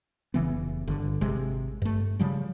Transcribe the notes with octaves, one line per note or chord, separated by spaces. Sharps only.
F1 C#3 E3 B3
G1 D3
G#1 C3 G#3
G2 A3
C#3 F3 G3